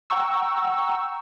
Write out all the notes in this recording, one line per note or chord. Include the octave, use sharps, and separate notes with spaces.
F#5 G5 A#5 C#6 E6